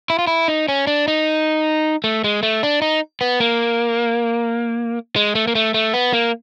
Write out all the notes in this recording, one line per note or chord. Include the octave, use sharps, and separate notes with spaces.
E4
F4
E4
D#4
C#4
D4
D#4
A3
G#3
A3
D4
D#4
B3
A#3
G#3
A3
A#3
A3
A3
B3
A#3